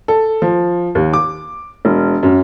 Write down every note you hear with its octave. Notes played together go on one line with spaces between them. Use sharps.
A4
F3
D#2
D6
E1
F#2